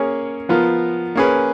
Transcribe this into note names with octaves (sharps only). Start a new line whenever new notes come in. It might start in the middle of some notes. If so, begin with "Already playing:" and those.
Already playing: A#3 C#4 G#4 C#5
F3 B3 F4 A#4
A#3 C#4 G#4 B4